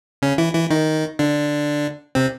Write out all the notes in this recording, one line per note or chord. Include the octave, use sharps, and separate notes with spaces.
C#3 C#4
E3 E4
E3 E4
D#3 D#4
D3 D4
C3 C4